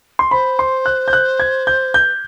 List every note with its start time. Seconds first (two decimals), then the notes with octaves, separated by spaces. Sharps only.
0.19 C6
0.31 C5 B5
0.59 C6
0.86 F#6
1.08 G6
1.13 F#6
1.40 G#6
1.67 G6
1.94 B4 G6